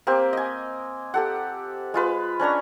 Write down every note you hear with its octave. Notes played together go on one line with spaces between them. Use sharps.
A#3 C4 G4
D#5 G#5
G4 A4 F#5
G#3 F4 B4
C#4 D4 C#5 A#5